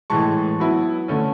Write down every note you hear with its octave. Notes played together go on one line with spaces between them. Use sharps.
A2 E3 G#3 A5 C#6
F#3 B3 E4
D3 A3 C#4